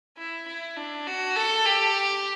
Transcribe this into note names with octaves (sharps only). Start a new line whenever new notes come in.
E4
E4
D4
F#4
A4
G4